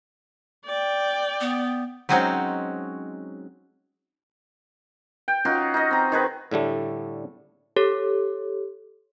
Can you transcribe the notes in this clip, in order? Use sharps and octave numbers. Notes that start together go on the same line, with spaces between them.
D5 G5
B3
F#3 G#3 C4 C#4 D#4 F#4
G5
C#4 D#4 F4 F#4
D#4 D#5
C4 A#5
D#3 G#4 B4 C5
A2 D3 G3 A3
G4 A4 C#5